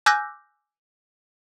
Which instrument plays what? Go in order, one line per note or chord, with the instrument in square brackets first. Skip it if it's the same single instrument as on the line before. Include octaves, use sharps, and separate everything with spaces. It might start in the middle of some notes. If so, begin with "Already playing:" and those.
[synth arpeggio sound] G#5 D6 E6 F#6 G6 A#6